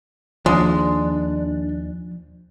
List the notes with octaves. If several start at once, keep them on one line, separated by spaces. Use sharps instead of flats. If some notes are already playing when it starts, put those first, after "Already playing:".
D#2 F3 G#3 D4